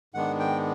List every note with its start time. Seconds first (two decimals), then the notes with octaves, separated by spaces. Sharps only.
0.14 G#2 D#3 G#3 B3 D4 F#5
0.39 G5